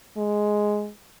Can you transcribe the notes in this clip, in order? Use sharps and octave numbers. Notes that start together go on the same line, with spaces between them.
G#3